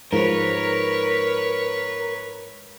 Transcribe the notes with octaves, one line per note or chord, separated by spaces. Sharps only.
G#2 F3 A#4 B4 C#5